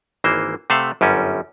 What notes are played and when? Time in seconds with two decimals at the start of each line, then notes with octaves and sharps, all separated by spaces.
0.24 G#1 E3 A#3 C5
0.70 C3 A3 C5 F5 F#5
1.01 G1 F#2 G3 C#4